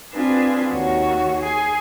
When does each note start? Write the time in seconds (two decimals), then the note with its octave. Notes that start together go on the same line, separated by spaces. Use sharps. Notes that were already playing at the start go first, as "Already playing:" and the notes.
0.13 C4 D4 F4 G#4 B4
0.71 D#2 F#4 C#5
1.39 G#4